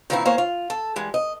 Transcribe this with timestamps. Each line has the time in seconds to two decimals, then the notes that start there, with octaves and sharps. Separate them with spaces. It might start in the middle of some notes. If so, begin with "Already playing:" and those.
0.10 A#2 D#3 E3 C4 D#4 E4
0.25 E3 A#3 C5 C#5
0.38 F4
0.70 A4
0.96 E3 G3 G#3
1.14 D#5